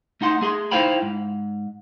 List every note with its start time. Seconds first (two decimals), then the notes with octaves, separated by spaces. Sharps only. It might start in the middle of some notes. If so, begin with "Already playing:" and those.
0.21 A3 D#4 F#5 C6
0.41 A3 G#4 B5 C6
0.71 D#4 E4 C5 F5 G5 B5
1.02 G#2